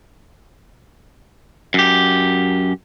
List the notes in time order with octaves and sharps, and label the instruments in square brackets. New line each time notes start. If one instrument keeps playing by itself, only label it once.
[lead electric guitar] F#2 G4